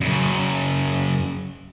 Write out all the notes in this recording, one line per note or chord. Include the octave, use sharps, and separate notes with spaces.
F#2 C#3